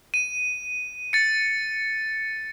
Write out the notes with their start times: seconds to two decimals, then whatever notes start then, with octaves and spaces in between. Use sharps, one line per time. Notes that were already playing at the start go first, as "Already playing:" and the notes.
0.14 D#7
1.13 A6 C#7